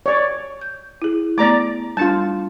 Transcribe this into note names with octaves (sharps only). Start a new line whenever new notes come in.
C#5 D5
G6
E4 G#4
A3 B3 D5 A#5 D6
G3 D4 F4 A5